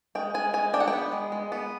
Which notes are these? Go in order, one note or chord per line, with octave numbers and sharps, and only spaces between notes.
G#3 G5
G#3 G#5
G#3 G#5
D4 G5
F#5
G5
B3
G#3
G#3
B3